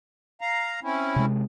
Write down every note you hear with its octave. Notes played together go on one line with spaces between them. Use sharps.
F5 A#5
C4 C#4 E4
C3 G#3